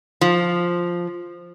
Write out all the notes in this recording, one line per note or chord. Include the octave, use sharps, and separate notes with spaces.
F3